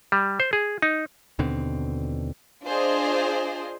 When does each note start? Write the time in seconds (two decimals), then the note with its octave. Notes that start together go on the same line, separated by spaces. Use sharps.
0.12 G3
0.40 C5
0.53 G#4
0.82 D#4
1.39 D#2 B2 D3 C4
2.64 D4 F4 G#4 C5 D5 D#5